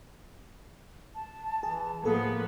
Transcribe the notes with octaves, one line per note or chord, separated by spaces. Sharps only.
A5
E3 G#4
A2 F3 A#3 B3 G#4 A4